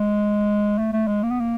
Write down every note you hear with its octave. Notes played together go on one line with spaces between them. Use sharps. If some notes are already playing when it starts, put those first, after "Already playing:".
Already playing: G#3
A3
A3
G#3
A#3
B3
A#3